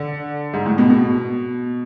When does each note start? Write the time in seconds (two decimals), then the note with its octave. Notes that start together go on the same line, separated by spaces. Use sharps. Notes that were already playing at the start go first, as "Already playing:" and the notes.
Already playing: D3
0.53 G#2
0.66 A2
0.78 B2
0.90 B2